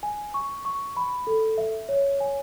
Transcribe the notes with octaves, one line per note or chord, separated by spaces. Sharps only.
G#5
C#6
C#6
B5
A4
E5
C#5
G#5